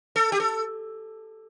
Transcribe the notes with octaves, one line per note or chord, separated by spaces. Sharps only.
A4
G4
A4